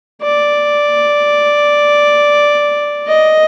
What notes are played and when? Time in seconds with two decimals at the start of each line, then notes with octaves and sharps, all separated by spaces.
0.22 D5
3.08 D#5